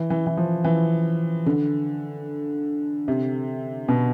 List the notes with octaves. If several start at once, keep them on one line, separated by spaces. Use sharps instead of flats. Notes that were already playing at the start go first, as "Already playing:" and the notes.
Already playing: E3
E3
E3
F3
E3
D3
C3
B2